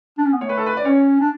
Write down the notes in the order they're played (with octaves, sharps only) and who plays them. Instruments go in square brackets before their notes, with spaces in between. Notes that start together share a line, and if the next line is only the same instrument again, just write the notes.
[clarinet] D4
C#4
B3
[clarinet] A3 [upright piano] C#5
[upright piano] B4
A4
B4
D5
[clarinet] C#4 [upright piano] C#5
[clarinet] D4